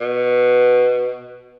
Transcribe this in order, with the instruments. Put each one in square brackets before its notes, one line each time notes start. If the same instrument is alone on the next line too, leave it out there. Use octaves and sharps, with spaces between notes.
[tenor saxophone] B2